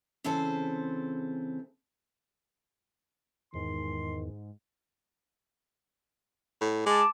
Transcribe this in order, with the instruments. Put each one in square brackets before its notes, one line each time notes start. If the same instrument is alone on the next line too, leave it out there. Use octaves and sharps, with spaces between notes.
[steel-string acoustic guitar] C#3 E3 C4 G#4 A4 C5
[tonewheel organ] E2 [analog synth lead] G#2 [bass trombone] D#3 [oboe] C6
[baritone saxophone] A2
[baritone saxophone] G#3 [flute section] A5 D6